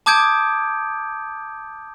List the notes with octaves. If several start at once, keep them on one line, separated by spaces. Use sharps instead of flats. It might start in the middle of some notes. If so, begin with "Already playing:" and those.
A5 D6 D#6 G6 G#6 D7